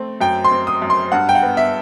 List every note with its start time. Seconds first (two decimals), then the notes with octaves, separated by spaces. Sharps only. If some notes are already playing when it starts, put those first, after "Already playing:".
Already playing: A3 C4
0.21 F#2 G5
0.44 C6
0.52 C4
0.67 D#6
0.82 F#2
0.90 C6
1.12 G2 F#5
1.29 G5
1.35 F#5
1.43 B3
1.57 E5